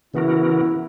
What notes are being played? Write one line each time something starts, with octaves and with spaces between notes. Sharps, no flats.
C#3 E3 B3 E4 F#4 A#4